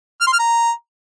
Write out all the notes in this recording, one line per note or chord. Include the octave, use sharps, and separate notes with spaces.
F6
C6
F6
A#5